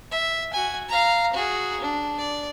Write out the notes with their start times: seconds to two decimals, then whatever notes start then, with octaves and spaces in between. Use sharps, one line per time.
0.11 E5
0.53 F#4 G#5
0.89 F5 A#5
1.33 F#4 G#4
1.81 D4
2.18 D5